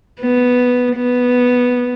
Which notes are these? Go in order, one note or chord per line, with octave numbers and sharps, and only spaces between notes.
B3
B3